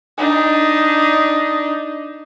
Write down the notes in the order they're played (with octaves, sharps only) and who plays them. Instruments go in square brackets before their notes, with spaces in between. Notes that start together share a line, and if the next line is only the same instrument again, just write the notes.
[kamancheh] D4 D#4